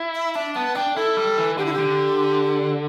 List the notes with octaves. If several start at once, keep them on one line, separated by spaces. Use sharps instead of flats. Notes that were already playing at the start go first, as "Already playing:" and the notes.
Already playing: E4
E5
D4 E5
B3 A5
D4 G5
E4 A4
G3
E3
D3 G4
E4
D3 G4